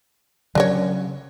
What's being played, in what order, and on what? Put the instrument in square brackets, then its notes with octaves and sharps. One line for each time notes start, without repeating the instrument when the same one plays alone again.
[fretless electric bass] C#3 F#3 [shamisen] D4 A#4 C#5